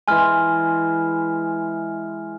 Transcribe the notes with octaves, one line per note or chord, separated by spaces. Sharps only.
E3 G#3 G#5 F6